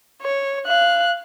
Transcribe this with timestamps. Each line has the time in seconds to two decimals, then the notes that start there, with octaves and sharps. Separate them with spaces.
0.22 C#5
0.67 F5 F#6